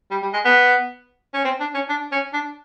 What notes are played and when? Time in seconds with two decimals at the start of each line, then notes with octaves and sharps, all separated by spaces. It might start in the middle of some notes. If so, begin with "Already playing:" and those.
0.11 G3
0.23 G3
0.34 G#3
0.45 B3
1.34 C#4
1.45 C4
1.60 D4
1.75 C#4
1.89 D4
2.12 C#4
2.33 D4